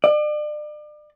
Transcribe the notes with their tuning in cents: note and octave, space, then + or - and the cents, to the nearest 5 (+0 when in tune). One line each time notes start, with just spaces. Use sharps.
D5 +35